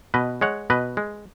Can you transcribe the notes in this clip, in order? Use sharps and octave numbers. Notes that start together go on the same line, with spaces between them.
B2 B4 D#5
G#3 C#5 F#5
B2 B4 D#5
G#3